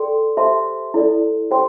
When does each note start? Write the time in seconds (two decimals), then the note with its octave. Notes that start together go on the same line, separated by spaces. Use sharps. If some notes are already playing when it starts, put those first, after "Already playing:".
Already playing: A4 D5 G5 C6
0.37 G4 C5 E5 A5 C6
0.94 E4 A4 D5
1.51 G4 C5 G5 C6